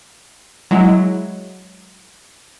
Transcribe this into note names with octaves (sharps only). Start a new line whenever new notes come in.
F#3 G#3 E4